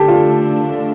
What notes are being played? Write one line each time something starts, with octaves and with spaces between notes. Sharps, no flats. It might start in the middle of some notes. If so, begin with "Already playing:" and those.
Already playing: D3 A3 D4 G4 A4
F4